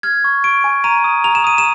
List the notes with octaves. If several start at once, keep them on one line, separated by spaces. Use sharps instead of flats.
F6 G#6
C#6
C#6 D7
G#5
A#5 D#7
D#6
A#5 F7
E7
D#6 D#7
E7